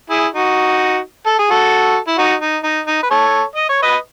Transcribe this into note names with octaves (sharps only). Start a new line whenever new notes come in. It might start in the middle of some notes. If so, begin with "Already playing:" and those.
E4 G#4
D#4 F#4
A4
G#4
F#4 A4
E4
D#4 F#4
D#4
D#4
D#4
B4
A4 C#5
D#5
C#5
B4 D#5